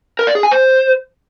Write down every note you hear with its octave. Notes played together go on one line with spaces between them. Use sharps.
A#4
D5
G#4
G#5
C5